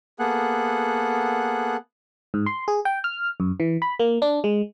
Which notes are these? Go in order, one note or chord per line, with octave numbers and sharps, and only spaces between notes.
A#3 B3 G#4 A4 F#5 F#6
G#2
C6
G#4
G5
F6
F#2
E3
B5
A#3
D4
G#3